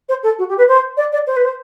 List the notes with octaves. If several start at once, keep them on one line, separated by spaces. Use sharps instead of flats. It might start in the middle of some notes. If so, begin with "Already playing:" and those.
C5
A4
F#4
G4
B4
C5
D5
D5
C5
B4
C5